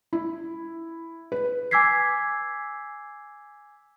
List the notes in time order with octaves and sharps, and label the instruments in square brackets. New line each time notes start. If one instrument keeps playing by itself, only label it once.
[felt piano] E4
B4
[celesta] G#5 D6 E6 G#6 B6 C7